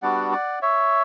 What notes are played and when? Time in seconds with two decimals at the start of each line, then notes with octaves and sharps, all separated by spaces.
0.02 G3 B3 D4 F#4 D5 F#5
0.32 D5 F#5
0.62 C#5 E5